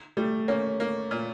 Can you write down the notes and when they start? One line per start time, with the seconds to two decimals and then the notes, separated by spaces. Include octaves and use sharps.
0.17 G3 A3
0.48 A#3 C#4
0.80 A#3
1.11 A#2